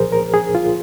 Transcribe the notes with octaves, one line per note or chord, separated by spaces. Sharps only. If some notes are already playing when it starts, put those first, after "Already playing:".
Already playing: C2 A#2 F3 G#4 A#4 C5
A#4
G#4
F4